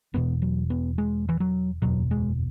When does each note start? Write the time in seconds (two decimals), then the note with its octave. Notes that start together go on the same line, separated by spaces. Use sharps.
0.14 E1 E2 B2 B3
0.42 F#3
0.70 B3
0.98 G#3
1.29 E3
1.40 F#3
1.82 F#1 E2 B2 F#3
2.11 G#3